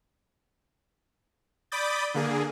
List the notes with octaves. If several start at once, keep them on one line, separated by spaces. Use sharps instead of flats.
D5 B5 D6 D#6 G6 A6
D3 A#3 G#4